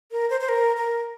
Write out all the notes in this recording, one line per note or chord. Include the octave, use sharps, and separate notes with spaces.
A#4
C5
C5
A#4
A#4